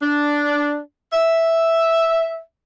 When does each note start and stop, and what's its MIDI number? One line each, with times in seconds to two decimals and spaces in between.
0.01 0.78 62
1.12 2.40 76